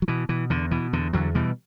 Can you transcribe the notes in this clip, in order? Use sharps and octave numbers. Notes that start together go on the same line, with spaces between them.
F#3
B2 E3
B2 E3
E2 D3
B2 E3
E2 D3
E2 D3 F#3
B2 E3 G3